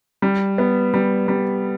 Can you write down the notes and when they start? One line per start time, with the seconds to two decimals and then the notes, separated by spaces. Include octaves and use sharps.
0.22 G3
0.58 B3
0.94 G3
1.28 G3